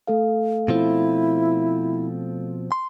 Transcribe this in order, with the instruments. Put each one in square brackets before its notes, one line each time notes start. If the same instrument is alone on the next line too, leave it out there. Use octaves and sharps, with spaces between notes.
[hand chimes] A3 A4 F5
[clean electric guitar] B2 F3 C4 [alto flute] E4
[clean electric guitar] C6